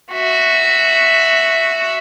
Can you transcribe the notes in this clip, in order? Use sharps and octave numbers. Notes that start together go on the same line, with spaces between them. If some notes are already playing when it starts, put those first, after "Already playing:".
F#4 E5